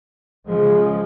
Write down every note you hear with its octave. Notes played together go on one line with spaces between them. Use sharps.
C#3 F3 G#3